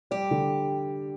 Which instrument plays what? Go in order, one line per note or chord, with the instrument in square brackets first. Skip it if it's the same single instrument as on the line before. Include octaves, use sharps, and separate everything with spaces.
[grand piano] G3 [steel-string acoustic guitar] G4
[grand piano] D3